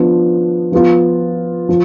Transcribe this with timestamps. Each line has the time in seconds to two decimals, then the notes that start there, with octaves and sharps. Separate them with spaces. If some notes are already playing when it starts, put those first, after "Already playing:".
Already playing: F3 B3 D4
0.72 F3 B3 F4
1.69 F3